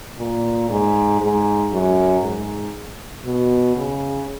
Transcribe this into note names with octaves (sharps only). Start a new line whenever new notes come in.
A#2
G#2
G#2
F#2
G#2
B2
C#3